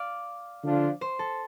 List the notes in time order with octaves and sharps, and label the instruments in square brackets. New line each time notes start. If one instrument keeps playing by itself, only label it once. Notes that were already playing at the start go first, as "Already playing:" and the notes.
Already playing: [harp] D5 F5
[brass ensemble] D3 F3 D4 F4
[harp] C5
A4